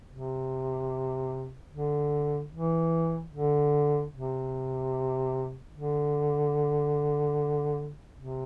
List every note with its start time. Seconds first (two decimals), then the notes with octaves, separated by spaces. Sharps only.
0.10 C3
1.71 D3
2.52 E3
3.32 D3
4.13 C3
5.75 D3
8.17 C3